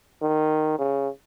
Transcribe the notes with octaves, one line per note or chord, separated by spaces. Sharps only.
D#3
C#3